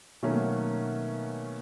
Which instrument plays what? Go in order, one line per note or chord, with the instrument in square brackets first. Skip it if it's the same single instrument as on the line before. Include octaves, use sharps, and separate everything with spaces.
[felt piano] B2 D#3 F#3 A3 A#3 C#4